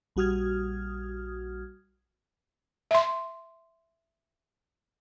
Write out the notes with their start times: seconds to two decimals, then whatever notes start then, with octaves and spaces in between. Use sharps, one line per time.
0.16 A#1 G3 F#4 D#6 F6 G#6
2.91 E5 C6